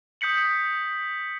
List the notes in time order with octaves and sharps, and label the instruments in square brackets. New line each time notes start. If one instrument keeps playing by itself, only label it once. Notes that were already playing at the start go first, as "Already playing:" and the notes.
[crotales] D#6 G6 B6 C#7 F#7